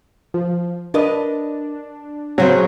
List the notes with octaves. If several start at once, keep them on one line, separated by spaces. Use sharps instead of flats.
F3
D4 A#4 B4 D#5
C#3 F#3 C4 C#4